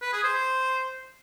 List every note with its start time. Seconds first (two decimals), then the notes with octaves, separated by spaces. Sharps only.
0.02 B4
0.13 G#4
0.24 C5